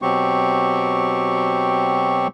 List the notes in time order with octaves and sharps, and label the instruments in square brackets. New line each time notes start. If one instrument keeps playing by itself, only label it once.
[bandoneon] B2 F#3 C4 G4 C#6